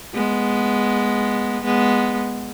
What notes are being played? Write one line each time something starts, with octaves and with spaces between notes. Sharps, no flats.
G#3 B3
G#3 B3